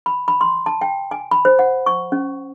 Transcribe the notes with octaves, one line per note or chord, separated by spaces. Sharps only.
B5
B5
C6
A5
G5
G#5
B5
C5
F#5
C#6
C#4